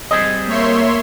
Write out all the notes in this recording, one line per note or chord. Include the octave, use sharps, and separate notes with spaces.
G3 C4 G#4 D#5 D#6
A#3 C#5 E5 C6